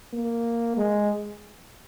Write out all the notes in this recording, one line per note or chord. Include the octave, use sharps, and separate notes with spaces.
A#3
G#3